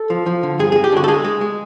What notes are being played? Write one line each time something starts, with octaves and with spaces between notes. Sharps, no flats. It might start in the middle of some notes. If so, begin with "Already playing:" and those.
Already playing: A4
F3
F3
D3
G2 G#4
G#3 G#4
G4
D3 F#4
A4
G#3 G#4
G#3
G#3